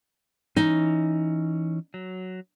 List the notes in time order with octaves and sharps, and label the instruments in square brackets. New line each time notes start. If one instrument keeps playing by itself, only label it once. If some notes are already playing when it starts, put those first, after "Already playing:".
[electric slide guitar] E3 C#4 [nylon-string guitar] D#4
[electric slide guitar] F#3